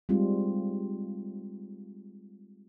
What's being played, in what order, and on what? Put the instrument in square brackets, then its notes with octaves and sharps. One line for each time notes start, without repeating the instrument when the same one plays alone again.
[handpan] G3 G#3 C4 D#4 F4